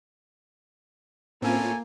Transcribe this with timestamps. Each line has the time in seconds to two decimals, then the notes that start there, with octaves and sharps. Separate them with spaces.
1.42 A2 A#3 C4 C#4 E4 F4 A4 G#5